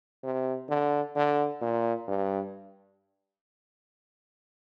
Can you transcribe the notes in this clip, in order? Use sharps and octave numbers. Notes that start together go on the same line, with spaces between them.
C3
D3
D3
A#2
G2